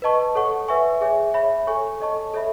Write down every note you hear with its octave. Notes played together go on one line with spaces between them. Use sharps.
B4 D#5 A5 C#6
A4 C#5 F#5 C#6
B4 E5 G#5 C#6
G#4 C#5 E5 G#5
C#5 E5 B5
A4 C#5 G#5 C#6
A4 D#5 A5 C#6
A4 C#5 E5 B5